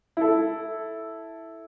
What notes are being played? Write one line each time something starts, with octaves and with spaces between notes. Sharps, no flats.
E4 A4